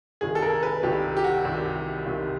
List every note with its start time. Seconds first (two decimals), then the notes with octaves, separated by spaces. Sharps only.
0.21 C2 C3 D#3 G#4
0.35 A4
0.42 A#4
0.63 B4
0.83 C2 C3 D#3 G4
1.17 G4
1.24 F#4
1.44 C2 C3 D#3
2.06 C2 C3 D#3